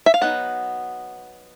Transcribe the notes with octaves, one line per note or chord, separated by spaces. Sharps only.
E5
F5
F#3 B3 D#4 F#5